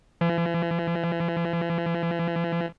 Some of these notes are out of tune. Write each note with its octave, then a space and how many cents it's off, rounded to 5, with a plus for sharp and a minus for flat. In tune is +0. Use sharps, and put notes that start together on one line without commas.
E3 +45